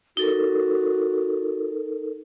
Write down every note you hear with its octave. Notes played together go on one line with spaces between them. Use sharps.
D#4 F#4 A4 A#4